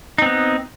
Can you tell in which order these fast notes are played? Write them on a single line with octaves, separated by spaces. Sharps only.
D#4 C4 B3